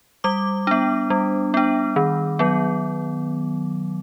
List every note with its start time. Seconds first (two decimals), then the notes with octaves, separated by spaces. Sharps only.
0.24 G3 D6
0.67 B3 D4
1.10 G3
1.54 B3 D4
1.96 D#3
2.39 F#3 B3